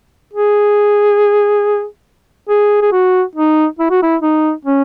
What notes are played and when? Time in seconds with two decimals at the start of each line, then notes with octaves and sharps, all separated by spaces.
0.34 G#4
2.49 G#4
2.82 G#4
2.92 F#4
3.35 D#4
3.79 E4
3.90 F#4
4.03 E4
4.21 D#4
4.65 C#4